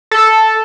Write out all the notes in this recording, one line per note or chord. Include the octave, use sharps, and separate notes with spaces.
A4